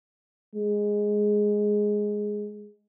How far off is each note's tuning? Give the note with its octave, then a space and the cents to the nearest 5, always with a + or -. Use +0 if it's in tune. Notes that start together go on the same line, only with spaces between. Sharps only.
G#3 +0